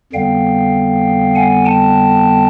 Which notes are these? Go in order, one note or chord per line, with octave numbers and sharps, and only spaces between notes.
F2 D3 G3 B3 F5 G5
F#5 G#5
G5 A5